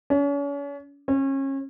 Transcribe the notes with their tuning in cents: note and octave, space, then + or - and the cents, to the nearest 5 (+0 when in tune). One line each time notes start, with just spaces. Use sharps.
C#4 +40
C#4 -30